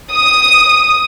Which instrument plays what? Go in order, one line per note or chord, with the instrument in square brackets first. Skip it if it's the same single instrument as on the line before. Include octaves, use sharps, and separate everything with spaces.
[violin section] D#6